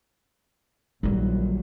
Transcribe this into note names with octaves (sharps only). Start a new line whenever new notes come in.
A#1 D#3 F#3 G3